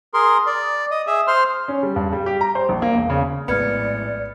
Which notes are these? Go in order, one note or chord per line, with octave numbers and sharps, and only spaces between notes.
G#4 A#4 C6
D5
D#5
G#4 E5
C5 C6 F6
C#4
G3
G2
G3
G4
A#5
C5
A#1
A#3
E1
C#3
A#1 A2 G#3 B3 D5 F6 G#6 C#7